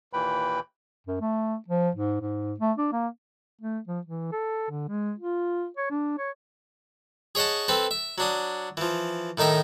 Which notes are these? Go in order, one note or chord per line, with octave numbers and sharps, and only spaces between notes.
D#2 A#2 E3 B4 G5 B5
F#2
A3
F3
G#2
G#2
A3
D4
A#3
A3
F3
E3
A4
D3
G#3
F4
C#5
D4
C#5
G#4 C#5 D#5 F#5 A5
C4 A4 B4
E5
F#3 D4 D#6
E3 F3
A2 D#3 D#4 D#5 E5